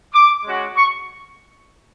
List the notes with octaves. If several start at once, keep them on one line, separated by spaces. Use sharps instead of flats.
D6
G#3 C#4 F#4
C#6